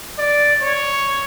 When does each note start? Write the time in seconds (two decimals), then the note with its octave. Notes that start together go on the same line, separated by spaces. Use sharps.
0.19 D5
0.63 C#5